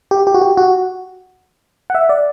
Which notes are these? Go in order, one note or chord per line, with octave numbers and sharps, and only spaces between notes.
G4
G4
F#4
G4
F#4
F#5
E5
D5